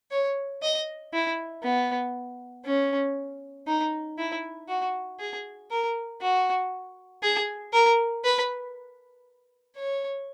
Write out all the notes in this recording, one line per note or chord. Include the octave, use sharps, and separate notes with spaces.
C#5
D#5
E4
B3
C#4
D#4
E4
F#4
G#4
A#4
F#4
G#4
A#4
B4
C#5